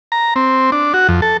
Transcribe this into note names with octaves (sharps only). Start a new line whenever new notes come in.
A#5
C4
D4
F#4
F2
A4